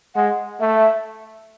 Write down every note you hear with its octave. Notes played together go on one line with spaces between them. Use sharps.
G#3 F#5
A3 E5